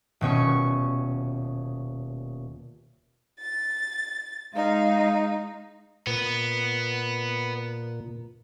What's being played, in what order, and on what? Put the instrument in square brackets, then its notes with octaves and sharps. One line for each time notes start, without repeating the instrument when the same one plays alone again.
[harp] D#1 B2 C#4 C#6
[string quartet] A6
[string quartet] G#3 D#4 [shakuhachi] F5
[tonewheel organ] A#2 [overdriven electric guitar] B3